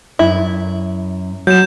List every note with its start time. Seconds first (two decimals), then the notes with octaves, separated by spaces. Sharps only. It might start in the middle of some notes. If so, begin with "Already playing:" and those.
0.19 F#2 E4
1.47 F#3 G6 E7